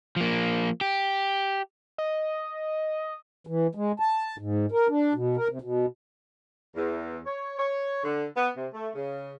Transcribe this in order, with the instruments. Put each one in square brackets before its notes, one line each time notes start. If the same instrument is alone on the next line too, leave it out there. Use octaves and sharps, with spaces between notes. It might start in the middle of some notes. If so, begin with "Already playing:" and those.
[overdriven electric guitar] F3 A#3
G4
[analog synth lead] D#5
[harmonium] E3
G#3
A5
G#2
A#4
D4
B2
A#4
C3
B2
[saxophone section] E2
C#5
C#5
D3
B3
C3
A3
C#3